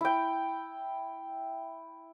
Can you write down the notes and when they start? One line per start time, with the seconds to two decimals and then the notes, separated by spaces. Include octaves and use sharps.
0.01 E4 G5